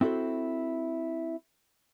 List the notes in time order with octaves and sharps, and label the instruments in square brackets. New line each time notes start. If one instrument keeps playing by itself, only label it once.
[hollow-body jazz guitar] C4 E4 F#4 A4 C5